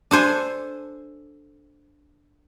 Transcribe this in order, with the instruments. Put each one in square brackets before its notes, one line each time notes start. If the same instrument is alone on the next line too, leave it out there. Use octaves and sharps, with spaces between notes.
[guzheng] D4 A4 C5 G#5